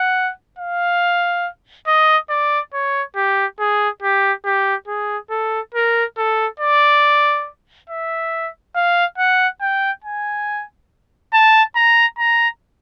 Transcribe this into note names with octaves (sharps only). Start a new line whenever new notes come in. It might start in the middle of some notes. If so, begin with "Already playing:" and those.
Already playing: F#5
F5
D#5
D5
C#5
G4
G#4
G4
G4
G#4
A4
A#4
A4
D5
E5
F5
F#5
G5
G#5
A5
A#5
A#5